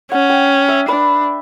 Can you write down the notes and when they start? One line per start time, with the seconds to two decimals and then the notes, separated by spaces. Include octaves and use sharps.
0.11 C#4 F#5
0.30 G5
0.68 E5
0.88 D4 B4